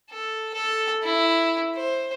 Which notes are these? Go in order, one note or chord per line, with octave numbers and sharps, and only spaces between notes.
A4
A4
E4
C5